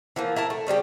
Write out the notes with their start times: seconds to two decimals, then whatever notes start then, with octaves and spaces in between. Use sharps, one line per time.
0.16 E3 F3 A#3
0.36 E4 A#4 A5
0.50 A3
0.67 C#3 G3 D4 G4